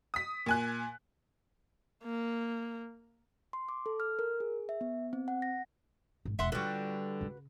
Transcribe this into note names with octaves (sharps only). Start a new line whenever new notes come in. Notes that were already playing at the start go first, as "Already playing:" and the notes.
D#6 B6
A#2 G#5 F#6
A#3
C6
D6
A4
F6
A#4
G#4
E5
B3
C4
F#5
A#6
G#1
E1 E5 F#5 C6
D3 G3 F4 F#4 B4
C#3